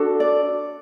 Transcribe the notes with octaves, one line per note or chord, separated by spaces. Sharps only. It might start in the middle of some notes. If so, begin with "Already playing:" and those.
Already playing: D4 F#4 A4
D5